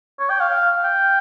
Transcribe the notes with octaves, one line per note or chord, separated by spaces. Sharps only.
C#5
G5
F5
G5